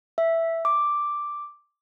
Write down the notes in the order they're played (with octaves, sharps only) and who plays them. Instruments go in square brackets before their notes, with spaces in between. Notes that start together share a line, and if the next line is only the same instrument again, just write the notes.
[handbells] E5
D6